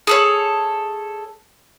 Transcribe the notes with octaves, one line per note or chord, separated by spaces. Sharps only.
G#4 A4 C#5